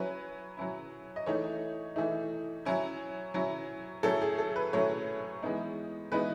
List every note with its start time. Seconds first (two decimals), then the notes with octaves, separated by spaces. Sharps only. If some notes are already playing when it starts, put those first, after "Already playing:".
Already playing: F#3 C#4 E4 B4
0.57 F#3 C#4 E4
1.16 D#5
1.26 E3 A3 D#4 C#5
1.96 E3 A3 D#4
2.65 F#3 C#4 E4
3.34 F#3 C#4 E4
4.03 A2 F#3 A3 C#4 A4
4.22 G#4
4.38 A4
4.56 B4
4.73 A2 F#3 A3 C#4 C#5
5.43 E3 G#3 B3 D#4
6.12 E3 G#3 B3 D#4 B4